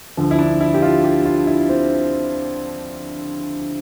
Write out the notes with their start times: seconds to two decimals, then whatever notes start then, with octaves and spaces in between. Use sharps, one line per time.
0.17 D2 D3 F3
0.31 E4
0.39 D4
0.61 E4
0.74 G4
0.82 F4
1.04 G4
1.25 F4
1.47 E4
1.69 C4